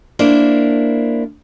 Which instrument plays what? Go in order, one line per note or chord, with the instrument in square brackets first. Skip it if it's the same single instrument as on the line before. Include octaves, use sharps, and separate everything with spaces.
[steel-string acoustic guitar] A#3 D4 E4 C5